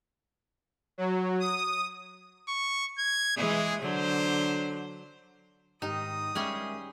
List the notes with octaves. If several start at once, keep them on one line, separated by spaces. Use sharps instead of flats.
F#3
D#6
C#6
G#6
E3 G#3 G#4
D3 F#3 C5
G#2 D#3 D#4 G4 D#6
G3 G#3 C#4 G#4 A#4 E5